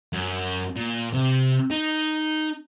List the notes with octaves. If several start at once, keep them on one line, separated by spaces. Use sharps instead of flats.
F#2
A#2
C3
D#4